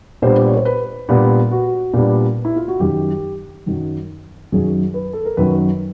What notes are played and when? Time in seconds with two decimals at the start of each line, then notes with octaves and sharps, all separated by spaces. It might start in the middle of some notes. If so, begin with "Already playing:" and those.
0.22 A#2 G3 B3 D4 C5
0.40 D5
0.48 C#5
0.57 C5
0.65 B4
1.08 A#2 G3 B3 D4
1.51 F#4
1.94 A#2 G3 B3 D4
2.45 E4
2.56 F4
2.68 F#4
2.80 F#2 D#3 F#3 G4
3.66 F#2 D#3 F#3
4.52 F#2 D#3 F#3 G#4
4.94 B4
5.13 A4
5.25 A#4
5.37 F#2 D#3 F#3 B4